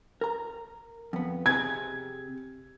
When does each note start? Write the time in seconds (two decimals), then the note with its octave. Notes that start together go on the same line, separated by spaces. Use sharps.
0.21 A#4 A#5
1.13 F2 B3
1.46 C3 G#4 G#6